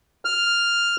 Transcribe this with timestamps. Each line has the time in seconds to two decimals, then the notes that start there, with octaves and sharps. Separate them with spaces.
0.25 F6